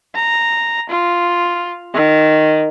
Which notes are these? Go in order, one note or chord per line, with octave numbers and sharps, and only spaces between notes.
A#5
F4
D#3